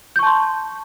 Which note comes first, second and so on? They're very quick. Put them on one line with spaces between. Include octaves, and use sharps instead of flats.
G6 C#6 A5 C6